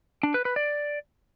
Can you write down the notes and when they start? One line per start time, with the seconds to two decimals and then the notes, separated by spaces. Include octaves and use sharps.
0.23 D4
0.34 B4
0.45 B4
0.56 D5